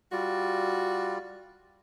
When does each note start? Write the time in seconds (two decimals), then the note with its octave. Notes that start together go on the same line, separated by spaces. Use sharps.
0.12 G3 F4 F#4 D5